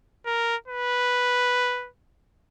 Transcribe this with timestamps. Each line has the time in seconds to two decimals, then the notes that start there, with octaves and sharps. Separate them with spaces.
0.26 A#4
0.68 B4